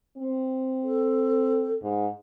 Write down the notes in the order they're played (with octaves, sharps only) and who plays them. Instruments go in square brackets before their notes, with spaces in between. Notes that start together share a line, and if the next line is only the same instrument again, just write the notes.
[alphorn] C4
[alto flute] A4
[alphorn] G#2